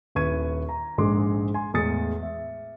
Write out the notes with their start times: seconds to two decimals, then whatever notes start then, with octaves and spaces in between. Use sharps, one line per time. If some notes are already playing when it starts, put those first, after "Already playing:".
0.15 D#1 E4 B4 C#6 G#6 D#7
0.69 A#5
0.98 A#1 G#2 G#3 C6 D6
1.54 G#5 C6
1.73 E2 A2 G#3 D#6 A6 C#7
2.23 E5